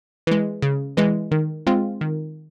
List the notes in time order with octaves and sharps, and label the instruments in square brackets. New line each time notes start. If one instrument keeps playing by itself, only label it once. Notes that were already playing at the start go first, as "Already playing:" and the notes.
[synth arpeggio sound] E3 G#3
C#3
E3 G#3
D#3
G#3 C4 F4
D#3